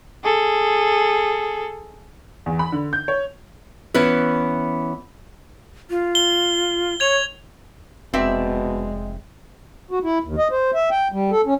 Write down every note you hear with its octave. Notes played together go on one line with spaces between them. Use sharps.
G#4 A4
E2
B5
D3
G6
C#5
E3 B3 C#4 E4 B4
F4
G7
C#5 G#6 F7
F1 B2 G#3 C4 D5 E5
F#4
E4
D#2
D#5
C5
E5
G5
G3
A4
C#4